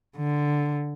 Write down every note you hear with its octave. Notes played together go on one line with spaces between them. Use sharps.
D3